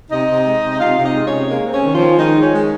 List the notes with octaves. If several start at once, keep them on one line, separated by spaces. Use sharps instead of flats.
C3 D#4 D#5
C3
G#3
C3
C3 F4 F5
C3
D#4 D#5
G#3
C#4 C#5
C3
G#3 A#3 A#4
C4
C#4 C#5
D#3
F3 F4
D#3
D#3 G#3 D#4
G#3
C#4
G#3